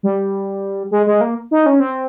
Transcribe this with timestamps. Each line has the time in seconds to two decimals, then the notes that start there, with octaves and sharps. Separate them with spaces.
0.03 G3
0.91 G#3
1.06 G#3
1.21 A#3
1.51 D#4
1.66 C#4
1.80 C4